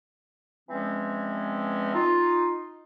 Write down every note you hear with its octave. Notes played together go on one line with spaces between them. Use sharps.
E2 E3 F3 G#3 C4 C#4
D#4 F4